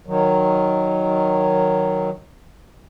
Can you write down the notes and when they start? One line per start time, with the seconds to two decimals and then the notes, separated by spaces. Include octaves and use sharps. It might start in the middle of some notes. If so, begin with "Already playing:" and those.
0.07 D#3 F#3